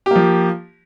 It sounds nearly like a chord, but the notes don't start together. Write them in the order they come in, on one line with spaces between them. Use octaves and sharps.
G4 A#3 F3